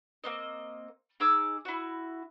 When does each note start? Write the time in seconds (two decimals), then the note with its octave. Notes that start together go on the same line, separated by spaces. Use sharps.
0.24 A#3 C4 D#5
1.20 D#4 G#4 D6 E6
1.65 E4 F#4